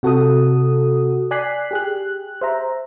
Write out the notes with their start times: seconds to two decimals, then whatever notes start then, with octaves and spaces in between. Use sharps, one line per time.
0.03 C3 F#4 A4 F#5 D#6
1.31 D5 G#5 F#6 B6 C7
1.71 G4 G#4 F#6
2.41 C5 E5 A#5